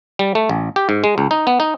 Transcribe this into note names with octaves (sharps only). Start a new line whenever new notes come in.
G3
A3
A1
G4
G#2
G#3
C#2
D#4
B3
D#4